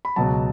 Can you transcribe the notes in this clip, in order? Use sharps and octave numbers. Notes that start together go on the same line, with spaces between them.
B5
C#2 B2 F#3 A5